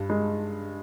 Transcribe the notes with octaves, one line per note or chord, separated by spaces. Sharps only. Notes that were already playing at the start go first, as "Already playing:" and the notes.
Already playing: G2
G#3